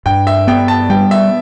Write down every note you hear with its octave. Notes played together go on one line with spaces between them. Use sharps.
G2 G5
E5
B3 G5
A5
G3 G5
E5